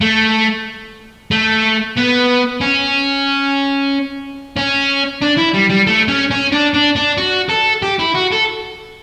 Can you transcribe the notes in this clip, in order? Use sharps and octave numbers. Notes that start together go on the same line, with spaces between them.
A3
A3
B3
C#4
C#4
D4
E4
G3
G3
A3
C#4
C#4
D4
D4
D4
F#4
A4
G4
E4
F#4
A4